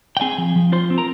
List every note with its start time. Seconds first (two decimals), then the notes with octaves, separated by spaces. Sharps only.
0.17 G5
0.21 C4 G#4 G#5
0.38 F3
0.56 F3
0.72 F4 C5 C6
0.90 C4
0.98 A#4 A#5